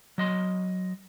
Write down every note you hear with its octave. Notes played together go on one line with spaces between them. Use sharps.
F#3 D#5 C6